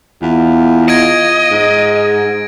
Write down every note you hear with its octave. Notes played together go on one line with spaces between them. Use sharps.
E2 F4
D#5 G#6 A#6 D7
G#2